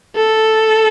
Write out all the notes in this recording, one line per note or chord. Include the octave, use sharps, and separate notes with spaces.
A4